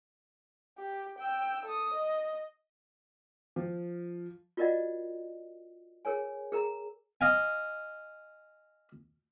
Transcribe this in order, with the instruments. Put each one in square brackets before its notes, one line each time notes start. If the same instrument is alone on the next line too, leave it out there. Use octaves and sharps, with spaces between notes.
[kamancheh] G4
G5 E6
A4 D#6
D#5
[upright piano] F3
[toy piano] F4 F#4 A#4 D5 D#5 F#5
G#4 A#4 C#5 G#5
G#4 A#4 A#5
[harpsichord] D#5 F5 G#5